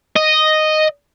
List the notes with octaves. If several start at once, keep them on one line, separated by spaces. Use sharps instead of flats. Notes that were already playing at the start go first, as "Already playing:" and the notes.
D#5